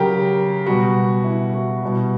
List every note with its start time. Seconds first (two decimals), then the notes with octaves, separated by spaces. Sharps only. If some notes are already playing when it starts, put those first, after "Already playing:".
Already playing: C#3 F#3 G4 A#4
0.66 B2 G3 F#4
1.24 E4
1.54 F#4
1.82 B2 G3